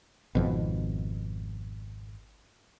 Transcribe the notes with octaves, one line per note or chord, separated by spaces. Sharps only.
G#1 F2 B2